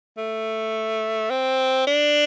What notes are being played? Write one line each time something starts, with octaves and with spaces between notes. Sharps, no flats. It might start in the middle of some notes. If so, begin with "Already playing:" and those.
A3
C4
D4